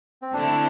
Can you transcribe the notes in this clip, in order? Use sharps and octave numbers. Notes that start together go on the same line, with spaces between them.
C4
D3 A3 C4 D4 E4